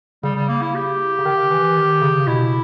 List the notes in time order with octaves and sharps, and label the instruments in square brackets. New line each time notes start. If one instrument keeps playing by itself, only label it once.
[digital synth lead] C#3 [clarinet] G3
[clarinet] G3
A#3
E4
G4
[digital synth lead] C#3
D#3
E3
D#3
C#3
[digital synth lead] B2 [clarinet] E4